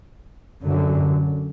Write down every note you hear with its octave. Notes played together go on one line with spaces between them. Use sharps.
F#2 D3 F#3